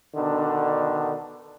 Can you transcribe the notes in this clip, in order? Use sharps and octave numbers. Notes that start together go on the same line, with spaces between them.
B2 D3 D#3 D4